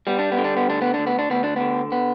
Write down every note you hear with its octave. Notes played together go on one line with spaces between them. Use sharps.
G3 B3
D4
B3
D3
D4
B3
D2 D4
B3
D2 D4
B3
D4
D2 B3
D4
D3 B3
B3